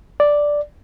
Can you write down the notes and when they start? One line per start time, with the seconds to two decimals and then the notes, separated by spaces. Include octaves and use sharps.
0.20 D5